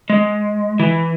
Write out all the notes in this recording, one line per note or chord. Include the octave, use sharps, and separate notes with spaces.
G#3
E3